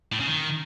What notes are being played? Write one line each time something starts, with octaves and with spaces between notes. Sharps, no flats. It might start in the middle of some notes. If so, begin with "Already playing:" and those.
A2
C#3
D#3